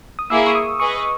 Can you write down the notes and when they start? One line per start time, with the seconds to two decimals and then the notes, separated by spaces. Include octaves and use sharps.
0.19 D#6
0.30 A#3 E4 G#4 E6
0.47 C#6
0.55 D#6
0.80 G#4 B4 D#5 C#6